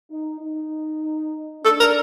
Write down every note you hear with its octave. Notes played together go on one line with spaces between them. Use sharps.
D#4
D#4
D4 A4
A#4